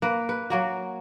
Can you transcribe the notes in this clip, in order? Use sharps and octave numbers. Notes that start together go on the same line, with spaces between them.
A#3 B4
B4
F#3 A#3 F#4